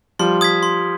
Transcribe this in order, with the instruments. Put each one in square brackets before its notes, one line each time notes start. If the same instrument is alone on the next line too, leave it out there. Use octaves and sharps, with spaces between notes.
[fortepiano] F3 G3 [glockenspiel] C6
[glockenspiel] D#6 G#6 B6
C6